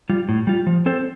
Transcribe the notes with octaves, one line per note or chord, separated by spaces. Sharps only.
G3 F4
A2
G3 F4
F3
C4 A4 C5